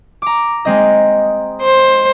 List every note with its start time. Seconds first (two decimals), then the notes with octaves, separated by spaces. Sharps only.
0.22 A#5 D6
0.65 G#3 C4 D#5
1.62 C5